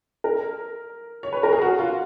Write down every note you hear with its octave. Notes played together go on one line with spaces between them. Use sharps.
A#4
C#5
B4
A#4
G#4
F#4
F4